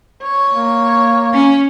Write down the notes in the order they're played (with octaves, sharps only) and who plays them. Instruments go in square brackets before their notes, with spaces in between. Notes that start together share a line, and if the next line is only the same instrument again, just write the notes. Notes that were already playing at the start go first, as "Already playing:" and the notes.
[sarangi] C#5
[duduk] A#3
[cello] C#4